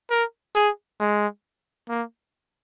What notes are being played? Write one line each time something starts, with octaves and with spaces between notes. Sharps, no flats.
A#4
G#4
G#3
A#3